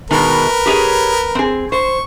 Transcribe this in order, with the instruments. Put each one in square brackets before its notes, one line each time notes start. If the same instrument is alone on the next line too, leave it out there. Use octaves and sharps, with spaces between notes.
[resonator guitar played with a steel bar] B2 D#3 G#3 [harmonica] A#4 B4
[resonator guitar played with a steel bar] G4 G#4 C#5
C4 G#4
[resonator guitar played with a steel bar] C5 [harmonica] C#6